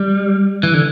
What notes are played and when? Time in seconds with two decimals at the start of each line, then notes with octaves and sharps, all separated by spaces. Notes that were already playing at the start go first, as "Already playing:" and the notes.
Already playing: G3
0.63 E3
0.74 D3